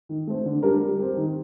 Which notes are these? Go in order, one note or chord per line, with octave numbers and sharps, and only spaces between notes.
D#3
A3 C4
D3
G3 D4 G4 A#4
G3
C4 G4
D#3